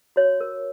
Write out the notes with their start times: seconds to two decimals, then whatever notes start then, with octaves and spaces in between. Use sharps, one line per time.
0.16 F#4 C#5
0.40 A#4